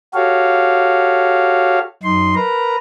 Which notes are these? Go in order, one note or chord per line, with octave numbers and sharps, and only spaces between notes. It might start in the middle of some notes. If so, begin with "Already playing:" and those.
F#4 G4 A4 C#5 F5
F#2 D#4 C6
A#4 B4 A#5